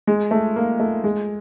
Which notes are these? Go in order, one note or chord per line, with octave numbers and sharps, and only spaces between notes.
G#3
A3
A#3
A3
G#3